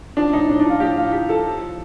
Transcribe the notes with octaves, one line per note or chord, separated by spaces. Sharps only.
F3 D4
A2 D#4
A2 D4
D4
F3
F4
A2 G4
A2 F4
F3 G4
F3 A4
F3
F3